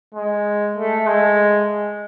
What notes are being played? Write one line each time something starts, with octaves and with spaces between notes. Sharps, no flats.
G#3
A3
G#3